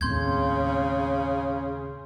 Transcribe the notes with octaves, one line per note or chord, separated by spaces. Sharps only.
D#2 A2 C#3 C4 C6 G6 G#6